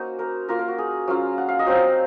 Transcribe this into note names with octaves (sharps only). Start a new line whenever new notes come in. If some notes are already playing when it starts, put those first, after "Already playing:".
Already playing: A#3 C#4 D#4 F#4 C5
A#4
A#3 F4 A#4
A#4
F#4
G#4
F#3 C#4 F4 F5
F#5
F5
D#5
F#3 C4 D#4 F5